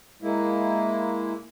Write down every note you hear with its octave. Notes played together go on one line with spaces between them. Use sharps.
G#3 A#3 E4